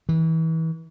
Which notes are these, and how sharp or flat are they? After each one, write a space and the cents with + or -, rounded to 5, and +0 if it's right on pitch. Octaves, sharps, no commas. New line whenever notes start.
E3 -30